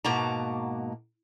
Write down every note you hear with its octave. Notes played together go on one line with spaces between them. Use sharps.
G#2 B2 A#3 F#4 A5 A#5